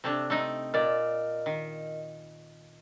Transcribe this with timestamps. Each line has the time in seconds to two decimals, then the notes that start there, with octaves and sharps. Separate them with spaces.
0.04 C3 A3 D4
0.30 A3 C4 D#4
0.74 A#2 A#4 D5 D#5 F6
1.46 D#3